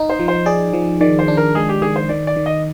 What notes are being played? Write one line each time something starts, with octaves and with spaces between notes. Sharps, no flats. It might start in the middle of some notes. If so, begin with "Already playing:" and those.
Already playing: D#4
C5
F3
C5
G#4 D5
F3
D#3 D5
C5
D4
A#4
G#3 G#4
G4
D#3 G#4
C5
D#3 D5
D5
D#3
D#5